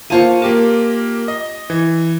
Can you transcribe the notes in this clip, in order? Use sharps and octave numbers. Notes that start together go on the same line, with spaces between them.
A#3 F4 C5 A5 C#6 D#7
A#3 G4 A#4 A5
D#5
E3